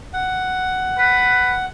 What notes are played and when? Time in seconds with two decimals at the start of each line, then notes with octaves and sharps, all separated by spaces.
0.13 F#5
0.98 B4